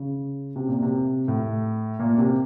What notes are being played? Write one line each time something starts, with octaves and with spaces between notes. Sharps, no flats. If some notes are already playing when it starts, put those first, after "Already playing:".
Already playing: C#3
C3
A#2
C3
A2
A#2
C3